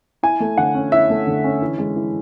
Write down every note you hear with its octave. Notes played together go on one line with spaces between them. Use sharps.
E4 G#5
A3
D3 F#5
C#4
E4 E5
A3
D3
C#4
E3
G#3
E3